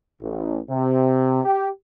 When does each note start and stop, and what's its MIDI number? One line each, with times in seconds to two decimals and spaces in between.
0.21 0.59 33
0.70 1.40 48
1.44 1.68 67